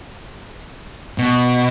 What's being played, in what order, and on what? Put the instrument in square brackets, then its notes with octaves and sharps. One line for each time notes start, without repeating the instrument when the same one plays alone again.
[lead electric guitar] B2